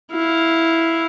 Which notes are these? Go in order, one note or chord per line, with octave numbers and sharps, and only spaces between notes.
E4 F5